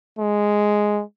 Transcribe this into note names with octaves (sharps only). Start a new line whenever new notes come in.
G#3